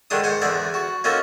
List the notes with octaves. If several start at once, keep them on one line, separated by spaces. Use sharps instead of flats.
D3 D#3 G#3 D4 C6 D#6
G#2 C5 F#5 G#5
E2 D3 G#4 D5
F#4
A#3 C#4 D#4 F4 F#4 A4